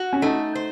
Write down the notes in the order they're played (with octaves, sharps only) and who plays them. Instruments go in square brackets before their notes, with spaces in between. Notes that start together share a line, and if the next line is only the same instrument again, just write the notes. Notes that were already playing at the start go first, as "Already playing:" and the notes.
Already playing: [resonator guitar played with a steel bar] F#4
[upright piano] C#4
[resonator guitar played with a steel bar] A3 [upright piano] D#4
[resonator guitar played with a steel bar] C5